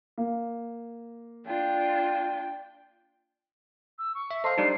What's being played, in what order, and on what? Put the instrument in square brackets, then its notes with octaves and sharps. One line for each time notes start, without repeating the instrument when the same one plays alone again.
[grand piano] A#3
[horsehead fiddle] D4 F4 [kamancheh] G5
[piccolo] E6
C#6
[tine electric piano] E5
[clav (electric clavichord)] A4 C5 [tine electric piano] D#5 F5 [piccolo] C7
[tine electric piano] G3 D4 D#4